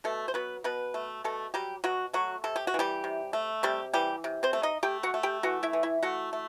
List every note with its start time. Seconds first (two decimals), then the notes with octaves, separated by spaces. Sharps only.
0.04 B2 A3 A4
0.28 C5
0.34 F#3 B3 B4
0.64 B2 B3 B4
0.94 A3
1.24 B2 A3 A4
1.54 F#3 G3 G4
1.84 B2 F#3 F#4
2.13 F#3 A3 F#4
2.44 C3 A4
2.56 G4
2.67 F#4
2.74 E3
2.79 G3 G4
3.04 C3
3.33 A3
3.63 C3 G3 G4
3.93 E3 G3 G4
4.24 C3
4.43 C4 C5
4.53 A3
4.63 D#4 D#5
4.83 A3 G4 G5
5.03 F#4 F#5
5.14 A3
5.23 G4 G5
5.43 E3 F#4 F#5
5.63 E4 E5
5.73 E3
5.83 E4 E5
6.03 A3 F#4 F#5
6.33 A3